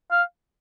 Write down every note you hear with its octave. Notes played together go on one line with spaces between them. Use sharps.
F5